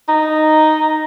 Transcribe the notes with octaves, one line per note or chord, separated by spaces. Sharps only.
D#4